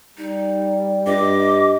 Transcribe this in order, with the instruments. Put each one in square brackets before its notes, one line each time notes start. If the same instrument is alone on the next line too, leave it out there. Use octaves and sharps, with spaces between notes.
[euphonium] G3 [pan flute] D#4
[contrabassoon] G2 [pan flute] D#5 [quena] D6